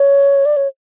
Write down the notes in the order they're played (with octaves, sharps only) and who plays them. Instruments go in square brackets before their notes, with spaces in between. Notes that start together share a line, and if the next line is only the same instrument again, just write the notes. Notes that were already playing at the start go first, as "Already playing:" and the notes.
Already playing: [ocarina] C#5
D5
C#5